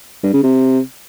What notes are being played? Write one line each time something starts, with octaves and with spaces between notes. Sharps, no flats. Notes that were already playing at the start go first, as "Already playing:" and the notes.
G2
C#3
C3